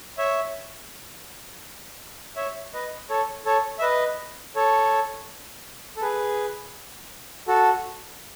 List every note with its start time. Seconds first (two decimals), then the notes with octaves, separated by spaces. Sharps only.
0.18 C#5 E5
2.36 C#5 E5
2.74 B4 D#5
3.10 A4 C#5
3.46 A4 C#5
3.79 E5
3.82 B4 D#5
4.56 A4 C#5
5.97 A4
6.02 G#4 B4
7.48 F#4 A4